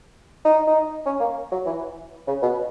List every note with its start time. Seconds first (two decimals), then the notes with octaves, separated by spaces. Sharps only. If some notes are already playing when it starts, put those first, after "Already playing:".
0.45 D#4
0.67 D#4
1.06 C#4
1.20 A#3
1.52 F#3
1.66 E3
2.28 C#3
2.43 B2